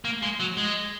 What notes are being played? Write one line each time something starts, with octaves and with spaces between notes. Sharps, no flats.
A#3
G#3
F#3
G#3